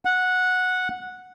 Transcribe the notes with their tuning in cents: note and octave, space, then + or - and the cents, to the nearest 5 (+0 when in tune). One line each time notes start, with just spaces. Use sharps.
F#5 -10